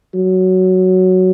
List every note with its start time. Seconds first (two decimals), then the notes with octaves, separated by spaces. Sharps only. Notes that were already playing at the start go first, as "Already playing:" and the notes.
0.15 F#3